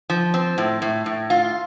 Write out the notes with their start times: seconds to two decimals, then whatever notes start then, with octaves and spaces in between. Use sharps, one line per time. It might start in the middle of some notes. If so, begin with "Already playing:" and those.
0.10 F3
0.34 C4
0.58 A2
0.82 A2
1.06 A2
1.30 F4